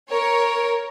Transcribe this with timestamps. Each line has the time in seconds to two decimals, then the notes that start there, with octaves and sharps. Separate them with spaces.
0.10 A#4 C#5